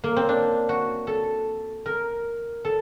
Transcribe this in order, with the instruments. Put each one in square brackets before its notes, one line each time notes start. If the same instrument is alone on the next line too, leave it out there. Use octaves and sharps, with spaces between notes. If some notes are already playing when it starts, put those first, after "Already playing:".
[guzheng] A#3
C4
D4
F#4
A4
A#4
A4